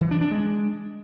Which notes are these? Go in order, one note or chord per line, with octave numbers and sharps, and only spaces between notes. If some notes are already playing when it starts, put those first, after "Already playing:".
E3
D4
D4
G#3